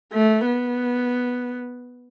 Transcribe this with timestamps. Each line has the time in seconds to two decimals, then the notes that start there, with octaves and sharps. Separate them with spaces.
0.13 A3
0.47 B3